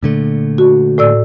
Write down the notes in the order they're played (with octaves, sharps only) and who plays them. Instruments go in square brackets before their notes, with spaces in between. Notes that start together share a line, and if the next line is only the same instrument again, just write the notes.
[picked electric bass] A#2 D3 A3
[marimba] F#4
A2 D5 E6